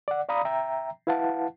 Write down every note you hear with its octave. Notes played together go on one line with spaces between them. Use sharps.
D5 F#5
D5 F5 A#5 B5 D#6
E5 G5 A#5
E4 B4 F5 F#5 A5